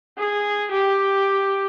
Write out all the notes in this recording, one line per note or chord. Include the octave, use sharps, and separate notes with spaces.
G#4
G4